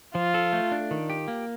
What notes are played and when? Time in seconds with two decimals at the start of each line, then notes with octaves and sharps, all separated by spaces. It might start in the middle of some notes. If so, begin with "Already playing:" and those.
0.15 F3 F4
0.34 A4
0.53 A3
0.72 D4
0.91 D#3
1.10 G4
1.28 A#3